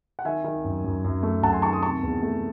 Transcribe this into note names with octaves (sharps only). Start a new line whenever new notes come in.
F#5
D#3 E5 G#5
D#3
F#2
F#2
F#2
A3
F#2 F#5 A5
G#5 C6
D#3 A5 C#6
C6 D#6
C3 A5 C#6
E2
A3